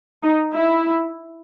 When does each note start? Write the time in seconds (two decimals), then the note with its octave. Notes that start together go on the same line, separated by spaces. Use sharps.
0.23 D#4
0.54 E4